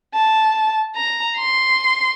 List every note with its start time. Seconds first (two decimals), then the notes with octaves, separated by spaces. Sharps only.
0.14 A5
0.96 A#5
1.37 C6